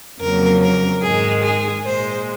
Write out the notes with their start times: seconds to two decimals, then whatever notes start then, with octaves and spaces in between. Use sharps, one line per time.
0.21 F2 C#3 F#3 A#3 A#4
0.62 A#4
1.03 G#2 D#3 G#3 G#4
1.44 G#4
1.85 A#2 G#3 C5